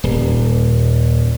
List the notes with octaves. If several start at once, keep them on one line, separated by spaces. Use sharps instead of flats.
D#1